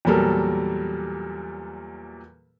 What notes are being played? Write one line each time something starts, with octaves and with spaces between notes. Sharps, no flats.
E2 A#2 F#3 G3 A4 A#4